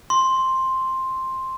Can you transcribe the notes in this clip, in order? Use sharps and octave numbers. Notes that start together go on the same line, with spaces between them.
C6